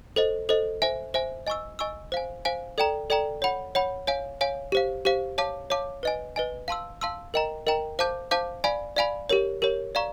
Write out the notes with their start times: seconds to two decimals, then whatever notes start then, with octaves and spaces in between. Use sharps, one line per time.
0.16 A4 C5 D#5
0.49 A4 C5 D#5
0.82 C5 E5 G#5
1.14 C5 E5 G#5
1.47 D#5 G#5 C#6 E6
1.79 D#5 G#5 C#6 E6
2.12 C5 F5 G#5
2.45 C5 F5 G#5
2.78 A4 D5 G5 A#5
3.10 A4 D5 G5 A#5
3.42 C#5 F#5 B5
3.75 C#5 F#5 B5
4.07 C#5 F5 G#5
4.41 C#5 F5 G#5
4.72 G4 C5 F5
5.05 G4 C5 F5
5.38 C#5 F5 A5 D6
5.70 C#5 F5 A5 D6
6.03 B4 D#5 G#5
6.36 B4 D#5 G#5
6.68 F5 A5 C6 E6
7.01 F5 A5 C6 E6
7.34 A#4 D#5 G5 A#5
7.67 A#4 D#5 G5 A#5
7.99 C5 F5 A5 D6 G6
8.31 C5 F5 A5 D6 G6
8.64 D5 F5 G#5 B5
8.96 D5 F5 G#5 B5
9.29 G4 A#4 C#5
9.62 G4 A#4 C#5
9.95 D5 F5 A#5 C#6